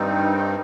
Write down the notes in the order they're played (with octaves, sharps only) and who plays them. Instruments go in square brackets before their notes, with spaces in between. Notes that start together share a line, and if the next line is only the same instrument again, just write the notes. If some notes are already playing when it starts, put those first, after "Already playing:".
Already playing: [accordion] G2 D#3 G3 C4 D#4